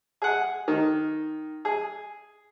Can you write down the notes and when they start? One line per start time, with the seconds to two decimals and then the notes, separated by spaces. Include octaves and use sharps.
0.22 G#4 F#5
0.68 D#3
1.65 G#4